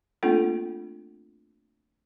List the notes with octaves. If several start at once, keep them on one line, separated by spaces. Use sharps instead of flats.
A3 A#3 C4 D4 F4 A4